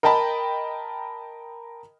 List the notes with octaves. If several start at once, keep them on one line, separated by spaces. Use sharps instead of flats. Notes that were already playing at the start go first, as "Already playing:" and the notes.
A#4 D#5 G5 A5 B5